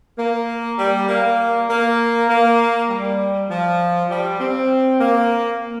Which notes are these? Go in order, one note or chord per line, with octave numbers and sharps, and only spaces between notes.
A#3
G3
A#3
A#3
A#3
G3
F3
G3
C4
A#3